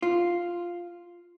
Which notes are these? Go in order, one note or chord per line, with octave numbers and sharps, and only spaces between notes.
F4